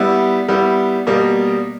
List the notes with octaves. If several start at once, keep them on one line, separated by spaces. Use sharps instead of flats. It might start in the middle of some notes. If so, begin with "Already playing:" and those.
Already playing: G3 B3 E4
G3 B3 E4
B2 G3 A#3